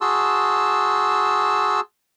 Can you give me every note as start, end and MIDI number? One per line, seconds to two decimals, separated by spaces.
0.01 1.80 66
0.01 1.80 68
0.01 1.80 81
0.01 1.80 84
0.01 1.80 88